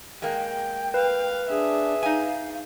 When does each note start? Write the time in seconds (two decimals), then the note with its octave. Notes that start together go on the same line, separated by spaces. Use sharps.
0.22 G#3 A#3 G5
0.94 B4 F5
1.49 D4 G#4 E5
2.03 D#4 F5 G#5